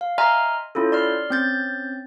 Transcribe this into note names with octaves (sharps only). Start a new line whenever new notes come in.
F5
D#5 E5 G#5 A#5 C6 F6
C#4 E4 F4 A4
D5 C6 F6
C4 C#4 G6 A6